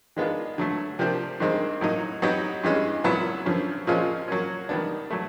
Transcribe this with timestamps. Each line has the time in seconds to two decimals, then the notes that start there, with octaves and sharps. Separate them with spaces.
0.16 D#3 G#3 B3 D4 F4
0.58 D3 F#3 A3
0.99 C3 F3 A#3 D4 G4
1.40 G2 D#3 G#3 C4
1.81 A2 F#3 A#3 D#4
2.22 F#3 B3 D#4 G4
2.63 G2 E3 G#3 C#4
3.04 A#2 F#3 B3 E4
3.46 F#2 D3 F3
3.87 A#2 F3 G#3 C#4 F4
4.28 F#3 A#3 C#4
4.69 D#3 G3 B3 D4
5.10 F#3 A3